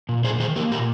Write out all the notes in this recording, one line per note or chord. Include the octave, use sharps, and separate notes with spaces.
A#2
A#2 G#4 C5
D#3 G#4 C5
A#3 G4 A#4
A#2 G4 A#4